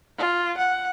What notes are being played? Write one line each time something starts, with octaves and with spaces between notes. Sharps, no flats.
F4
F#5